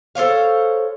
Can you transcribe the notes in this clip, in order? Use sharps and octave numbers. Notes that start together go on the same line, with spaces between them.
A4 C5 C#5 F5